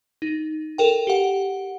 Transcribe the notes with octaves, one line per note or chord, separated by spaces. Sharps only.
D#4
A4 A#4 G5
G4 F#5